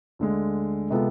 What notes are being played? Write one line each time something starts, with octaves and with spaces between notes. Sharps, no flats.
D2 D3 G#3
C3 G#3 B3 F4 A4